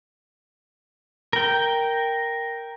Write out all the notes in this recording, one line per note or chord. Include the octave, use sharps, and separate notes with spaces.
A#4 G5